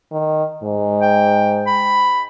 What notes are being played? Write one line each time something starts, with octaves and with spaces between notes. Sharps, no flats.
D#3
G#2
G5
B5